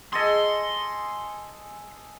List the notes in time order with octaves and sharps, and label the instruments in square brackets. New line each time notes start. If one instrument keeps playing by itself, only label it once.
[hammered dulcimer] G#4 A4 D#5 [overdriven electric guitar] C6